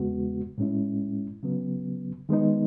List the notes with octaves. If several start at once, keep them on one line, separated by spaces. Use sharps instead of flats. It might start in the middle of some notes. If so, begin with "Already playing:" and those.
Already playing: E2 C#3 G#3 B3 F#4
A2 G#3 C#4 E4
C#3 F#3 B3
D#3 G#3 B3 D#4